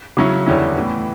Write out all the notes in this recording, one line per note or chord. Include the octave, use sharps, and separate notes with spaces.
C#3 F#3 C#4 E4
E2 D3 G3 C#4 E4
A2 E3 B3